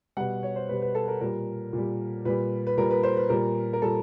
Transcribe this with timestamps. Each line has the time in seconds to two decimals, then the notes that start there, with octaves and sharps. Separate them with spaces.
0.17 B2 G3 F#5
0.43 C#5
0.56 C5
0.69 B2 G3 B4
0.82 B4
0.95 A4
1.08 A#4
1.21 A#2 G3 A#4
1.73 A#2 G3
2.25 A#2 G3 B4
2.67 B4
2.77 A#2 G3 A#4
2.91 B4
3.03 C5
3.17 B4
3.29 A#2 G3 A#4
3.73 A#4
3.82 A#2 G3 A4